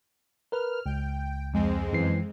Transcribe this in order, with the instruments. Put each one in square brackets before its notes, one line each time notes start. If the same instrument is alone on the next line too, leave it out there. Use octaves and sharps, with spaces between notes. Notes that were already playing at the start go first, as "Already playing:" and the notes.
[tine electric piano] A#4 B4 [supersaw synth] F6
[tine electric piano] C#2 [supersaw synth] G5
[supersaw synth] F2 G#3 C4
[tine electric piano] F#2 E3 C7